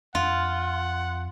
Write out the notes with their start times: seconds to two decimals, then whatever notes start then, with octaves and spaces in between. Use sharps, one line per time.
0.15 F2 F4 F#5